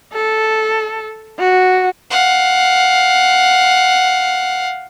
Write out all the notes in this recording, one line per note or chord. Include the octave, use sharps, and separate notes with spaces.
A4
F#4
F5 F#5